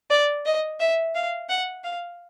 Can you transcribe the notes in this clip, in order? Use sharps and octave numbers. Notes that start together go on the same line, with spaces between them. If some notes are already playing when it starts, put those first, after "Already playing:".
D5
D#5
E5
F5
F#5
F5